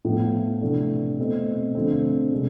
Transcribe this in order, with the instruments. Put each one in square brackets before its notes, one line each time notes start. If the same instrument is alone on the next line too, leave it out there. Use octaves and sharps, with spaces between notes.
[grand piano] A2 F3 B3
C3 E3 A3 D4
B2 A3 C4
D3 F3 A3 C4
C3 G#3 D4